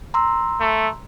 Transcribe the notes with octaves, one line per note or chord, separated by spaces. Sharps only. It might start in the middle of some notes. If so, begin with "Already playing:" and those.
A#5 C6 E6
A3